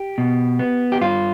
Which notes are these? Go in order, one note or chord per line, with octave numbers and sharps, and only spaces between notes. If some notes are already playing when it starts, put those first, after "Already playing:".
Already playing: G4
B2
B3
G4
G2 F4